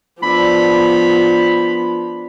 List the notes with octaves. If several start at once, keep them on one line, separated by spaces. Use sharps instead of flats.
F3 B3 D4 A4 D5 B5